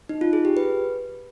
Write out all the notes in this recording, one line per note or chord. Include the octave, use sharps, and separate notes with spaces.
D#4
F4
G#4
G4
B4